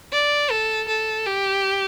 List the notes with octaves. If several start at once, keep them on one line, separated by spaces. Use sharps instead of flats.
D5
A4
A4
G4